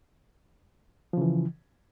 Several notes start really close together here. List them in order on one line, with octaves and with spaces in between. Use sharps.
F3 C#3 E3